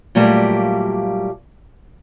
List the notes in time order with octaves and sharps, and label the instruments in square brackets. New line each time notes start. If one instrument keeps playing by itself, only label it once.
[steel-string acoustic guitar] A#2 F#3 G3 A3 A#3